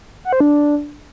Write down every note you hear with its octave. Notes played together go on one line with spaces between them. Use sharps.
F#5
C5
D4